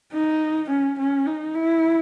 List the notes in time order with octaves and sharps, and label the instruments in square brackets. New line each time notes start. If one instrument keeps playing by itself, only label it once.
[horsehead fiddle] D#4
C#4
C#4
D#4
E4